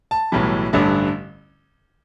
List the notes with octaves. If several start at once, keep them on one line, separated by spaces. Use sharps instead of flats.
A5
B1 A2 E3 G3
A1 G2 D3 A3